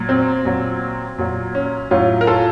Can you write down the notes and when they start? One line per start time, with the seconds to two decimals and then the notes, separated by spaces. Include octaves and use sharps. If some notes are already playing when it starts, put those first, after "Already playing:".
Already playing: A#2 F#3
0.09 C4
0.45 A#2 F#3
1.18 A#2 F#3
1.55 C#4
1.91 A2 F#3 C#4 F4
2.21 A#4
2.27 F4 A4